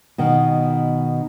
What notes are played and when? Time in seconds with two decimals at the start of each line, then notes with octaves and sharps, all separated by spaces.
0.18 B2 D#3